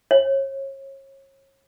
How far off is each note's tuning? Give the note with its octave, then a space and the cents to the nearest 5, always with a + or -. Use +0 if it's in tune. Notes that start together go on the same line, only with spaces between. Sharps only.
C#5 -35